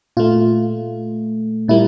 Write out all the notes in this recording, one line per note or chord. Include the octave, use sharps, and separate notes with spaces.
A#2 A3 F4
A#2 G3 A#3 E4